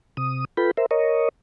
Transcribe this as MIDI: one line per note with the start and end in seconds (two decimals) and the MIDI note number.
0.17 0.45 48
0.17 0.45 87
0.57 0.71 65
0.57 0.71 69
0.57 0.71 71
0.57 0.71 79
0.57 0.71 83
0.77 0.86 70
0.77 0.86 72
0.77 0.86 76
0.91 1.29 70
0.91 1.29 73
0.91 1.29 75